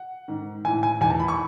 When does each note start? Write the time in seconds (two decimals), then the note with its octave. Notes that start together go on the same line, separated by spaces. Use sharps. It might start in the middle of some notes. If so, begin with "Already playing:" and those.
Already playing: F#5
0.28 G#2 D#3
0.65 A2 E3 G#5
0.83 G#5
1.01 E2 D#3 G#5
1.10 A5
1.20 B5
1.28 C#6